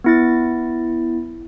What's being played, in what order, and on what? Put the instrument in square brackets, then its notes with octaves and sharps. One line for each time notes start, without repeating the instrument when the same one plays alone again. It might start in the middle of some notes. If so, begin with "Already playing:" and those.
[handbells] B3 E4 A6